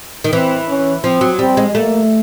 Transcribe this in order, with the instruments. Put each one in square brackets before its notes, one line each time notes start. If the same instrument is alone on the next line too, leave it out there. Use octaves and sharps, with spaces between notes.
[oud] D#3
[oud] E3 [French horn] C4
[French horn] C#4
[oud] F3 [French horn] C4
[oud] F#3
[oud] G3 [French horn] C4
[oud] G#3
[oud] A3 [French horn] A#3